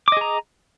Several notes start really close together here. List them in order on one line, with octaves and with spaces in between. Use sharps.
D6 D#5 G#4 A#5